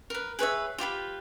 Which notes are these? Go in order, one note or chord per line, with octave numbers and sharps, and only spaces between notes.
A#4 B4
G#4 B4 C#5 E5
F4 G4 B4 B5